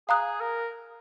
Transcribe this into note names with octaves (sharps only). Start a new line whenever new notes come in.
G#4 F5 A#5 D#6 F#6
A#4